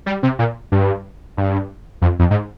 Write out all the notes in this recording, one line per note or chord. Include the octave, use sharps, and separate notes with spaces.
G3
C3
A#2
G2
G2
F2
F2
G#2